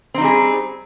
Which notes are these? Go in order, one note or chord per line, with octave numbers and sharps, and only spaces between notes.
G3 C4 D#4 G#4